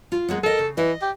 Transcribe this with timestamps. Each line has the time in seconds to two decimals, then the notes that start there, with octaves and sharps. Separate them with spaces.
0.12 F4
0.29 G#3 A#3 B3
0.43 A4 A#4 D#5
0.59 C#3
0.77 E3 D#5
1.02 G4